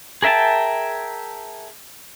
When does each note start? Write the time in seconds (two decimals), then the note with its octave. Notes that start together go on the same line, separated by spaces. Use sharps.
0.22 G#4 A#4 E5 G5 A5